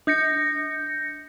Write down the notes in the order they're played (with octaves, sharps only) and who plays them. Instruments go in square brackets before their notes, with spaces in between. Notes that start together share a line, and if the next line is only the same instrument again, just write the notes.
[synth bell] D4 G6 A#6 C#7